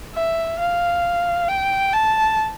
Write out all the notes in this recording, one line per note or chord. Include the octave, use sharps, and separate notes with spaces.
E5
F5
G5
A5